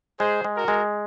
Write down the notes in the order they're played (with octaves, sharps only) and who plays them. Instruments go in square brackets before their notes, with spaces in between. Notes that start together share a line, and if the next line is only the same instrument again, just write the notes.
[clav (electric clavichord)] G#3 [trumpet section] G#4 C5
[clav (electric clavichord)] G#3
[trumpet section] F#4 A#4
[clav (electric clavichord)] G#3